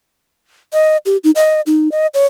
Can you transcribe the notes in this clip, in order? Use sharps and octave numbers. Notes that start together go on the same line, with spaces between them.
D#5
G4
D#4
D#5
D#4
D#5
C#5